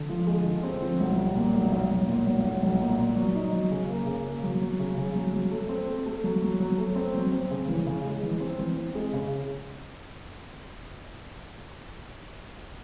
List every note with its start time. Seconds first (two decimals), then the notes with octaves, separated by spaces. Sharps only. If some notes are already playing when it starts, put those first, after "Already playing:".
Already playing: D3
0.09 F3
0.27 G#3
0.45 D3
0.63 C4
0.81 F3
1.00 B1
1.18 G3
1.35 A#2
1.54 B1
1.72 B1
1.91 B1
2.08 A#2
2.26 B1
2.45 B1
2.62 B1
2.80 A#2
2.98 A#2
3.16 F#3
3.35 D#4
3.52 F#3
3.71 C#3
3.89 A#3
4.06 C#3
4.25 A#3
4.43 F#3
4.61 F#3
4.80 C#3
4.97 C#3
5.15 F#3
5.33 F#3
5.51 A3
5.69 C4
5.87 A3
6.06 A3
6.24 F#3
6.42 F#3
6.60 F#3
6.78 A3
6.95 C4
7.14 F#3
7.32 C4
7.51 C#3
7.68 E3
7.87 C#3
8.05 G#3
8.23 E3
8.40 C4
8.59 E3
8.77 C4
8.95 G#3
9.13 C#3